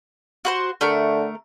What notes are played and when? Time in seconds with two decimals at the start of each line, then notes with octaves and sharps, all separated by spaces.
0.45 F#4 B4 C5
0.81 D3 A3 A#4